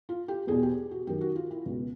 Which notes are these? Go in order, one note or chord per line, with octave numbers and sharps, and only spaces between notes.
F4
G4
E2 B2 G#4
G4
F#4
F#2 D#3 G4
F#4
F4
E4
C#2 B2